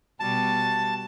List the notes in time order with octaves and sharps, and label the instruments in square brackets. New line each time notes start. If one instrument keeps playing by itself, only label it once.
[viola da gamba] B2 G3 F#4 [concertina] A5